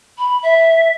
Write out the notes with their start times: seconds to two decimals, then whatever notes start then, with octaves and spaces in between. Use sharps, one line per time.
0.17 B5
0.42 E5